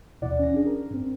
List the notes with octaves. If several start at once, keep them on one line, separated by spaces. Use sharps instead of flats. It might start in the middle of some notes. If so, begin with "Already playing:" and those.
D#2 B2 E3 E4 D5 F#5
C#4 A#6
D4 G#4
A#4
G2 C4